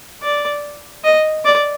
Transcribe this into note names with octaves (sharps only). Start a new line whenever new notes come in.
D5
D#5
D5